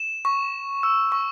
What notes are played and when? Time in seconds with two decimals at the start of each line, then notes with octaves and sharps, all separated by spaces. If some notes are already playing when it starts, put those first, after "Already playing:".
Already playing: E7
0.25 C#6
0.83 E6
1.12 C#6